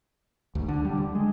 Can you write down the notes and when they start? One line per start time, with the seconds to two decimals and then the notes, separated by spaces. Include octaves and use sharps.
0.55 D2
0.68 D3
0.85 G3
0.98 D3
1.15 G#3